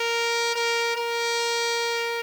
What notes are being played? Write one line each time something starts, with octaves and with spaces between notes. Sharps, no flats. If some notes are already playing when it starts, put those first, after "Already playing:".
Already playing: A#4
A#4
A#4